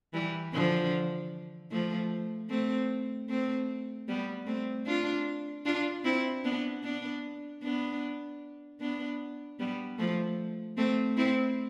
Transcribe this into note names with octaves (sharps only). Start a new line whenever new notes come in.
E3 G3
D3 F3
F3 A3
A3 C4
A3 C4
G3 B3
A3 C4
D4 F4
D4 F4
C4 E4
B3 D4
B3 D4
B3 D4
B3 D4
G3 B3
F3 A3
A3 C4
C4 E4